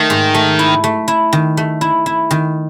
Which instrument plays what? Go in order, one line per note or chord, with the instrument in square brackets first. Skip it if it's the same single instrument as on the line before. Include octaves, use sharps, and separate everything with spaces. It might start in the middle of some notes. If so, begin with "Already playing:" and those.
Already playing: [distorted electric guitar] D#3 [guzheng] A3
[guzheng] G#2
A3
E4
A3
E4
D#3
A3
E4
E4
D#3